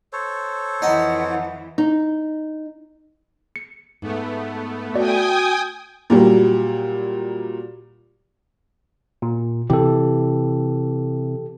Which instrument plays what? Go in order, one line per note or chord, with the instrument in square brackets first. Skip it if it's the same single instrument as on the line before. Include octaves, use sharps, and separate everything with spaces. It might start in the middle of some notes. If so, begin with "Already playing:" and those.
[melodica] A4 C5 C#5
[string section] F2 E3 [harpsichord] D#4 [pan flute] F#5
[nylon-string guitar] D#4
[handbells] C#7
[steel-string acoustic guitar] G#2 [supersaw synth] A3 B3
[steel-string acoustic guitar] F#4 [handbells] D5 [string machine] G5 G#5 D#6
[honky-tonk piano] A#2 F#3 G3
[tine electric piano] A#2
[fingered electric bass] C3 E3 [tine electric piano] G4 A4